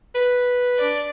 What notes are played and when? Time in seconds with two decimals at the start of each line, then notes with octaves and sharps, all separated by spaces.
0.15 B4
0.79 D4 D5